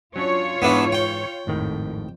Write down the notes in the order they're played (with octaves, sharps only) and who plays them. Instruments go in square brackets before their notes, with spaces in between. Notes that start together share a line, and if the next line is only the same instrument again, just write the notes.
[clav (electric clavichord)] F#3 C#4 D4 [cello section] F4 C#5
[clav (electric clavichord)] G#2 E3 F5 [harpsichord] B3 D4 E4
[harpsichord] G5
[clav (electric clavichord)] G#1 A2 D#3 [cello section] F2